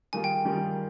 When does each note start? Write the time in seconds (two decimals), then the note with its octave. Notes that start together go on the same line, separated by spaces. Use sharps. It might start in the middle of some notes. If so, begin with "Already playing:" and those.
0.13 D#3 G3 A#3 F4 G#4 G#5
0.24 G5
0.45 D#3 G3 A#3 F4 G#4